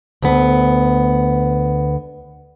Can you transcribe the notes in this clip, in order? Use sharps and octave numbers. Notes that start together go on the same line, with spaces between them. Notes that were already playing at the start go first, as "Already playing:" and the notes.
D2 B3